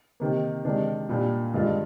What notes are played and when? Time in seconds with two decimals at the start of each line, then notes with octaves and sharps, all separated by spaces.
0.20 C3 D#3 A#3
0.65 C3 D#3 G#3 D4
1.09 A#2 G3 D4
1.53 G2 D#3 G#3 D4 F4